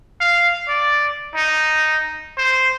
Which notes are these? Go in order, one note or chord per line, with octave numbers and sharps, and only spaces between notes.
F5
D5
D#4
C5